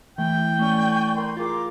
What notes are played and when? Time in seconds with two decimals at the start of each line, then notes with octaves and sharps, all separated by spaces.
0.18 E3 A3 E4 G5
0.59 A3 C#4 D5 G#5 C#6
1.14 A#4 B5 C6
1.37 F4 G#4 A#4 F5 D6